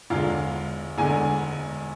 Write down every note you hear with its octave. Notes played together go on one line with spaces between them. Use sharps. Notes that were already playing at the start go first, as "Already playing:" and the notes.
E1 E2 D3 G#3 F4 F5
E1 E2 D3 G#3 G#4 G#5